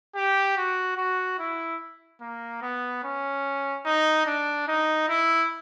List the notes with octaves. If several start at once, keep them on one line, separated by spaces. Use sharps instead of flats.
G4
F#4
F#4
E4
A#3
B3
C#4
D#4
D4
D#4
E4